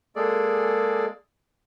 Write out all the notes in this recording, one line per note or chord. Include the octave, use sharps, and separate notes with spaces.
G#3 A#3 G#4 A4 D5